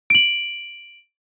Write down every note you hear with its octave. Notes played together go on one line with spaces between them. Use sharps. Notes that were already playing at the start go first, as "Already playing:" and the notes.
D7 F#7